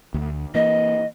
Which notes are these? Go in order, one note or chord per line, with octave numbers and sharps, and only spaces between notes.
D2
E3 A#3 D#5